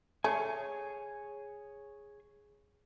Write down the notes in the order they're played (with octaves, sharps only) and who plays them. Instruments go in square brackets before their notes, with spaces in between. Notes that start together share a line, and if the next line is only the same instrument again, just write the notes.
[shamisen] A3 [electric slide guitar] G#4 C#5 G#5